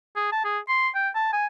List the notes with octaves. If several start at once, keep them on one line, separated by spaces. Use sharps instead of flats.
G#4
A5
G#4
C6
G5
A5
G#5